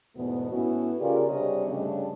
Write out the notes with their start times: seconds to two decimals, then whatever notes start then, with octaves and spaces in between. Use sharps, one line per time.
0.16 E2 G#2 B2 A3 B3
0.51 A2 B3 C#4 E4 F#4
1.00 C#3 F4 G4 G#4 A#4 D5
1.29 C3 G3 D4 G#4 C#5 D#5
1.67 G2 C#3 G3 A3 D4